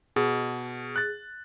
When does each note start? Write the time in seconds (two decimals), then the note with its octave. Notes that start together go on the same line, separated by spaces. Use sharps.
0.16 B2 G#4
0.96 F#6 A6